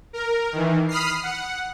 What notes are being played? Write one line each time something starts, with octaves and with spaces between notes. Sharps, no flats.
A#4
D#3 E3
B5 D#6 F6 C7
F#5